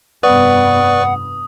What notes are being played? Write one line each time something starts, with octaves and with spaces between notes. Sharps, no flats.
F1 G2 B3 B4 D5 F#5 C#6 D#6